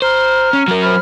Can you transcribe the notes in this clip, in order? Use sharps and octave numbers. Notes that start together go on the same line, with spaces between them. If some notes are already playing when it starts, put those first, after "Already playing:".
C5 A#5 F6
C#4
F#3 A#4
C5 B5 F6